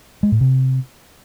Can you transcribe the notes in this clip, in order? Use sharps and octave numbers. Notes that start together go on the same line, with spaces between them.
G#3
A2
C3